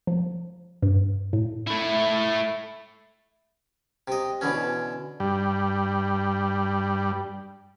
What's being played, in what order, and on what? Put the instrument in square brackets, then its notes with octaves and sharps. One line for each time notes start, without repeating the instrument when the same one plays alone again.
[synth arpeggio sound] F3
G2
A2
[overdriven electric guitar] A3 E4
[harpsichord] C3 D#5
B2 D3 E3 C#4
[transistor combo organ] G2 G3